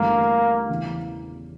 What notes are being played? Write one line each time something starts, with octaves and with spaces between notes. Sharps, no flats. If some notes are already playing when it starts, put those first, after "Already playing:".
Already playing: G1 G2 E3 A3 A#3 C#4
E2 C#3 E3